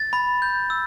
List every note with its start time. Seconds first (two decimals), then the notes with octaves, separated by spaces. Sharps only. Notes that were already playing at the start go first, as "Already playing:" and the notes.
Already playing: A6
0.13 B5
0.42 G6
0.70 E6